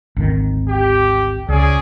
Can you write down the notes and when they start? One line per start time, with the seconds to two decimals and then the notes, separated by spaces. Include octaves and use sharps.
0.16 G#1 D2 D#3
0.69 G4
1.49 C#2 C#4 G#4 D5